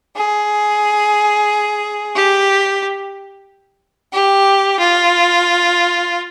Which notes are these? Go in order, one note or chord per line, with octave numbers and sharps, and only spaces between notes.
G#4
G4
G4
F4